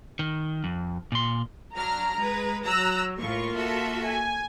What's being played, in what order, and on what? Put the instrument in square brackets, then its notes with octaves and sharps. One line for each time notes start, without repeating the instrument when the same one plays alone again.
[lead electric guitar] D#3
F2
A#2 C6
[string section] F#3 D4 F6 [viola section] A#5
[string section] G#3 B4
[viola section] F#3 [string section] A#5 E6 F#6
[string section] A2 C#6 [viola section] A#3 F4
[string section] F#4 A4 E5
[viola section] G#5